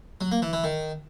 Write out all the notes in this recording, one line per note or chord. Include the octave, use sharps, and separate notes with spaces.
F#3
A#3
E3
E3
D#3